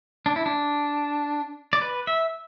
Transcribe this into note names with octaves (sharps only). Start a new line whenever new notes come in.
D4
E4
D4
D5
B4
E5